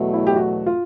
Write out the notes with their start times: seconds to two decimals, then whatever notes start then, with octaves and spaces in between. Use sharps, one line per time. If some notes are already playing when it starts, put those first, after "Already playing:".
Already playing: E2 B2 F#3 A3
0.14 E4
0.27 G4
0.36 F#4
0.66 F4